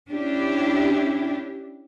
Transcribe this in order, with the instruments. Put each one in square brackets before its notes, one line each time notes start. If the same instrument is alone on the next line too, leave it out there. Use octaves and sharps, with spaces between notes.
[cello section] C#4 D4 E4 G4